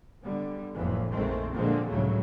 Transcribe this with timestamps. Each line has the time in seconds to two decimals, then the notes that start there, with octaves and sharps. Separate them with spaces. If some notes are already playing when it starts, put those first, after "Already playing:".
0.22 D3 G3 B3
0.76 F#1 F2 A2 E3 F3
1.12 A#1 F2 D#3 G#3 A3 C4
1.54 A#2 D3 F3 G#3 A#3 C4
1.89 F1 C#2 A2 C#3 F#3 A3